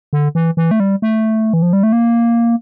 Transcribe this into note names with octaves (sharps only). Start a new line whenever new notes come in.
D3
E3
E3
A3
G3
A3
E3
F3
G3
A3
A#3